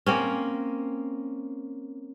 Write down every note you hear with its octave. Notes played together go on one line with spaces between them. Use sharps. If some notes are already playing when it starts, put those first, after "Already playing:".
A#3 C4 C#4